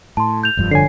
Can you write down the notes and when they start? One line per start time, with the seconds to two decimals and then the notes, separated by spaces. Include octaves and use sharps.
0.17 A2 A5 C6
0.43 G6 F7
0.57 F1 G2 F3
0.71 D3 C#5 G#5 C7